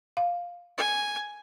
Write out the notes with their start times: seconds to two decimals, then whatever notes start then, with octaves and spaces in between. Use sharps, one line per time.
0.17 F5
0.78 G#5